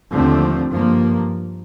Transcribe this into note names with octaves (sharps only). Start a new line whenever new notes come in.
D#2 D3 F3 A3 C4
G2 F3 A#3